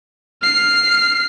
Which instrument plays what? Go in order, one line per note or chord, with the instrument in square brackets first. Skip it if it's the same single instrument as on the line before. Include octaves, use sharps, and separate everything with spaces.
[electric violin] F6 C7